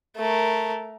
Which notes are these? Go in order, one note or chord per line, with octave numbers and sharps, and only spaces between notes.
A3 A#4